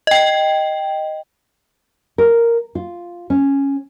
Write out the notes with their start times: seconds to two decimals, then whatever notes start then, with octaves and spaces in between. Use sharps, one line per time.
0.07 D#5 G5
2.18 A#4
2.75 F4
3.30 C#4